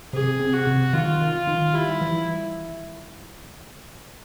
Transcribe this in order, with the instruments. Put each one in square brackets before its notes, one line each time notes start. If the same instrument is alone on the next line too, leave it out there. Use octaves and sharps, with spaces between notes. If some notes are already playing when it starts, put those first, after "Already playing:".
[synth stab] C3 [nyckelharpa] G#4
[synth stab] C3
[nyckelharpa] F#4
[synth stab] C3
[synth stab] D#3 [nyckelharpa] F4
[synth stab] D#3
[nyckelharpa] F4
[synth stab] D#3
[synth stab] G3 [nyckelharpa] E4
[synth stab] E3